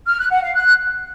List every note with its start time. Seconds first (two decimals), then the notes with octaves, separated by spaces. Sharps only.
0.07 F6
0.19 F#6
0.31 F#5
0.42 F5
0.54 F#6